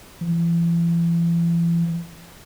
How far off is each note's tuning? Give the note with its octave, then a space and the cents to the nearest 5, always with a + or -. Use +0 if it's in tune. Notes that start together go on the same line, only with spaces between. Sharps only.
E3 +40